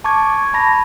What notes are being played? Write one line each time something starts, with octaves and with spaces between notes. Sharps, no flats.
A5 C#6 D6 G#6
A5 B5 A#6